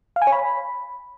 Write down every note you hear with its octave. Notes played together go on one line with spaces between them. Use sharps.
F5
G#5
C#5
B5